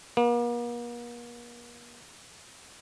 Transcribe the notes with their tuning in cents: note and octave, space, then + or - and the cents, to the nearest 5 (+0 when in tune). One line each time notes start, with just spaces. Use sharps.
A#3 +45